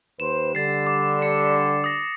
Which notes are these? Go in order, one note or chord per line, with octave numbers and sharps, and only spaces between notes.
D#2 B4 C5 E7
D3 G3 A6 C7
D6
C#7
D#6 A#6